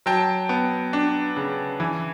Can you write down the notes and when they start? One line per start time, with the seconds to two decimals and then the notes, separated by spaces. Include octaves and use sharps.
0.06 F#3 G5 A5
0.49 B3
0.93 D4
1.36 C#3
1.80 E3